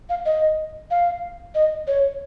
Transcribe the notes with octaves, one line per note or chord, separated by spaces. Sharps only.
F5
D#5
F5
D#5
C#5